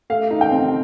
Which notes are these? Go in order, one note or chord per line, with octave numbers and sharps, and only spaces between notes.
A3 F5
D#4
G5
C4